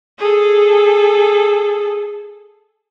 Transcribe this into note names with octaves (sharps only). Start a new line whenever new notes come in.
G#4 A4